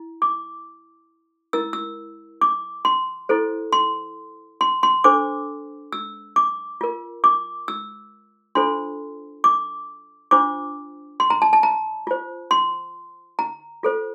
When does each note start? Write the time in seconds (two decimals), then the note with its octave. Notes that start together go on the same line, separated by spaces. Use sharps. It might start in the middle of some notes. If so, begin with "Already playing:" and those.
Already playing: E4
0.22 D6
1.53 E4 A#4 E6
1.73 E6
2.41 D6
2.85 C6
3.29 E4 A4 C5
3.73 C6
4.61 C6
4.83 C6
5.04 D4 A4 C5 D6
5.93 E6
6.36 D6
6.81 F4 A#4
7.24 D6
7.68 E6
8.55 D4 F4 A4 C5 C6
9.44 D6
10.31 D4 F4 C5 D6
11.20 C6
11.30 A#5
11.42 A5
11.53 A5
11.63 A#5
12.07 F4 C5
12.51 C6
13.39 A#5
13.83 F4 A4 C5